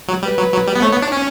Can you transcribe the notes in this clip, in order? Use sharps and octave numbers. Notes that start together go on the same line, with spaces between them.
F#3
G3 B4
F#3
F#3
G3
B3
A3 C#5
B3
D4
C#4